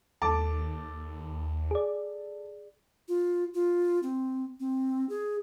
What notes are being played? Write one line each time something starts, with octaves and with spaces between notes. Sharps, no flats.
D#2 A4 A5 D6
G#4 D5
F4
F4
C4
C4
G#4